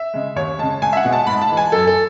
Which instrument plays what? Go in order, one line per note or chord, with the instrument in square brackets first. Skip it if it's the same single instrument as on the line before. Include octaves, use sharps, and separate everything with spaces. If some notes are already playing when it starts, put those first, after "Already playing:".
Already playing: [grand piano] E5
C#3 G#3
D#2 C#5
C#3 G#3 A5
C#2 G#5
E5
F#5
B2 G#3
A5
G#2 B5
A5
E3 G#3
G#5
F#2 A4
A4